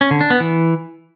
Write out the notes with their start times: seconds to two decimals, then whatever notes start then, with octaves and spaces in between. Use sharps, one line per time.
0.01 C#4
0.11 D3
0.21 D4
0.30 B3
0.40 E3